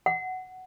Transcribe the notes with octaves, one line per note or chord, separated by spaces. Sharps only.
F#5